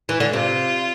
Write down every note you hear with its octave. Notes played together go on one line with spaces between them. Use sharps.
E3
D3
C3 F4